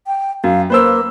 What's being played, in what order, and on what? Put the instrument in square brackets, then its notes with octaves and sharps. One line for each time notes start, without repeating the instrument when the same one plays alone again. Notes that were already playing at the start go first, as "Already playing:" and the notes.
[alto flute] G5
[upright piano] F#2 [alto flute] F5
[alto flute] A#3 [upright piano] B4 C5 E6